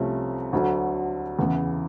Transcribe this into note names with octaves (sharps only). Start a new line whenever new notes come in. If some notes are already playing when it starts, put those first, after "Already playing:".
Already playing: C2 C3 F3 A3 C#4
D2 D3 F#3
E2 C#3 E3